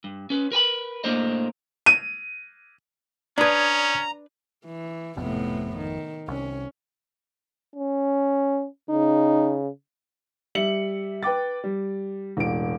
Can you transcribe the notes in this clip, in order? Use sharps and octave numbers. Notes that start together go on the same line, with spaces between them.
G2
C#4 B4
A#4 B4 G#5 B5
A2 A#3 D4 A#4 C5 D#5
D#7
C#4 D4 B4 D5 A#5 D#6 G#6
E3
G#1 F2 A2 C3 B3
D#3
C2 C#4
C#4
C#3 D#4
G3 E5 C#7 F#7
B4 G5 D6 A6
G3
E1 A1 D7